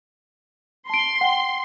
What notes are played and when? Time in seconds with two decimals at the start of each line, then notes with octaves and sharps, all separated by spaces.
0.90 A5 C6 D7
1.21 F#5 G5